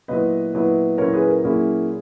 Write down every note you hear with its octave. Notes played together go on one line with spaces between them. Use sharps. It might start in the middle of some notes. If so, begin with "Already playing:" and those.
A#2 F#3 B3 E4 B4 D#5
A#2 F#3 B3 E4
A#2 F#3 A#3 C#4 E4 A#4 C#5
G#4 B4
A#4
A#2 F#3 A#3 C#4 E4 G#4